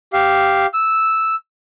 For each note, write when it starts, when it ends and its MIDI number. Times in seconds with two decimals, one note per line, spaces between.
0.13 0.66 67
0.13 0.66 77
0.74 1.35 88